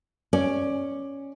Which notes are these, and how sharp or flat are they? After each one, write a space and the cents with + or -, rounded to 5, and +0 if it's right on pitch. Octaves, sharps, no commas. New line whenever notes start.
C#4 +0 D5 +10